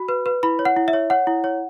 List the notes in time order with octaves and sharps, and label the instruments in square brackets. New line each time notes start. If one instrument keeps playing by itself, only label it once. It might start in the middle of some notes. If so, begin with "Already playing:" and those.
Already playing: [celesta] F#4 B5
B4
B4
E4 B5
C#5
F#5
E4
E5
C#5
C#5 F#5
E4
C#5